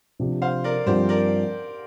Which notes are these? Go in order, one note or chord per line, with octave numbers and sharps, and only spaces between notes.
C3 F3 D4 G4
C5 F5
A#4 D5
G2 F3 C4 G4 C5
A#4 D5